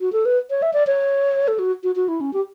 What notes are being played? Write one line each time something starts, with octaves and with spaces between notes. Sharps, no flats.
F#4
A4
B4
C#5
E5
D5
C#5
A4
F#4
F#4
F#4
E4
C#4
G4